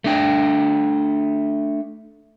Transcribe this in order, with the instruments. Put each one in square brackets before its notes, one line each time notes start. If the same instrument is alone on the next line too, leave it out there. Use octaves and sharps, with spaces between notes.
[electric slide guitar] A3 D4 G5